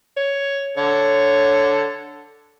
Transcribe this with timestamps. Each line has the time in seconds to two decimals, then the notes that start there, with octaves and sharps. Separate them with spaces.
0.17 C#5
0.77 D3 A4 C#5